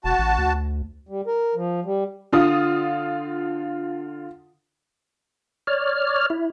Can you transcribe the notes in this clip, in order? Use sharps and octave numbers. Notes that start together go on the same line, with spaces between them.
E1 F#4 A5
A1
D2
G3
A#4
F3
G3
D3 F4 D#6
C#5 D5 F6
E4